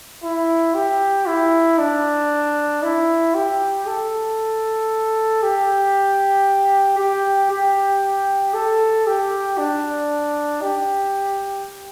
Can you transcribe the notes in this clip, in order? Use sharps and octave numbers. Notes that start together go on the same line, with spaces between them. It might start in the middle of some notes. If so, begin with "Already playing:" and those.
E4
G4
E4
D4
E4
G4
A4
G4
G4
G4
A4
G4
D4
G4